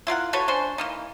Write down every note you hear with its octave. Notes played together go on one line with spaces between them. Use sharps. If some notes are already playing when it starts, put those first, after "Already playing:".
E4 F4 A#4 F#5
F#4 A4 B4 C#5
C#4 D4 C5
E3 A#3 D#4